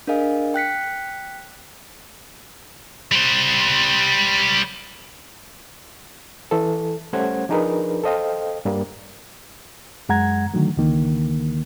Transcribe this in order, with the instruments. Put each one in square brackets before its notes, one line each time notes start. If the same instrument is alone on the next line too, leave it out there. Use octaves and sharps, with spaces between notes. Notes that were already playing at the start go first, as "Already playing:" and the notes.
[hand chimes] D4 G#4 A#4 D#5 F5 G#5
G5 F#6 B6 C#7
[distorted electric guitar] G3 C5
[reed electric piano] E3 A4
G3 A3 C#4 C5 F#5 G#6
F3 D4 D#4 G#4 A#4 B4
A4 C5 D#5 F5 G5
G2 G3 A#3
F#2 G#3 F#5 A#5 G#6
D3 D#3 F#3 A3
C#2 D3 D#3 A#3